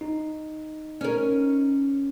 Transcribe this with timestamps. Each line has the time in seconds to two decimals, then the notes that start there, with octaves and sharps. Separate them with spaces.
0.01 D#4
1.01 C#4 A#4